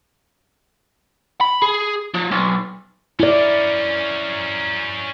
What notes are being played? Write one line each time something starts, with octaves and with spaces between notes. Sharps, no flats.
B5
G#4
F3
B1
C#4 E4 A#4 D5